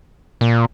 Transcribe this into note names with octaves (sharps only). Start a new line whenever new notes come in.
A#2